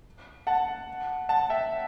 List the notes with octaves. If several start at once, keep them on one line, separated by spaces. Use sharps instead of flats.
F#5 A5
F#5 A5
E5 G5